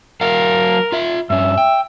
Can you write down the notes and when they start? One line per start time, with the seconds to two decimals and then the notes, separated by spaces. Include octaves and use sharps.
0.21 F#3 A#4 F5 F#5
0.92 F4 E5
1.30 G2 C#4 E5
1.58 G5